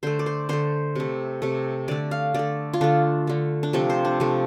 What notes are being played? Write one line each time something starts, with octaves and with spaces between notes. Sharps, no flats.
D3 A3 C5
D5
C5
D3 A3 C5
C3 A3
C3 A3
D3 A3 D5
F5
D3 A3 D5
F4
D3 A3 D4
D3 A3
D4
C3 F3 A3 C4
C5
D4
C3 F3 A3